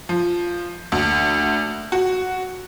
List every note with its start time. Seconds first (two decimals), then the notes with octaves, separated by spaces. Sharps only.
0.09 F3
0.92 D2
1.92 F#4